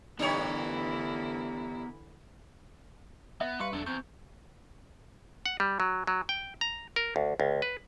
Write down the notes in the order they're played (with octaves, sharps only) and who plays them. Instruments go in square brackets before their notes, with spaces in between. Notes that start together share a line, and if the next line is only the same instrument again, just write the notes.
[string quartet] D3 E3 E4 [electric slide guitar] B3 A#4 [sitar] D4 G4 C#5
[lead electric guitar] B3 [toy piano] E5
[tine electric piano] G3 C#6 C#7 [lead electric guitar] B4 [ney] F5 [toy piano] C6
[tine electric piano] E2 [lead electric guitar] F#3 A4 [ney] D4
[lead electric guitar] E2 [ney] C4 [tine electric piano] C#6 G6
[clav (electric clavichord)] F#5
G3
F#3
F#3
G5
A#5
A#4
D2
C#2
B4